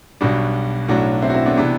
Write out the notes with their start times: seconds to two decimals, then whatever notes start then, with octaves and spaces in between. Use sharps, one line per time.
0.21 B1 B2 G3 D4 F#4
0.88 B1 A2 F#3 D4 F#4
1.22 C4 E4
1.30 F#4
1.34 C4 E4
1.46 B3 D4
1.57 C3 E3 B3 D4